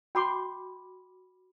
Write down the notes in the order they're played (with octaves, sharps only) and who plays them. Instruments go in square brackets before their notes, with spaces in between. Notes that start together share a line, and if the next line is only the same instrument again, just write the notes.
[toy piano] F#4 B5 D6 [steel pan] G5 C6